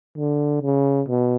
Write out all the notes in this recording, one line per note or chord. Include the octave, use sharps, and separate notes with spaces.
D3
C#3
B2